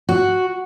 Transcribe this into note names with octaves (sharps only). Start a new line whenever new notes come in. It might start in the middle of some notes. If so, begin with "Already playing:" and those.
F#4